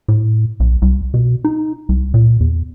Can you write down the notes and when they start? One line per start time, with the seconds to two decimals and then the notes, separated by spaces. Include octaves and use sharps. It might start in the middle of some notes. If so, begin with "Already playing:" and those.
0.08 A2
0.60 B1
0.82 C2
1.14 B2
1.44 D#4
1.89 C2
2.14 A#2
2.40 E2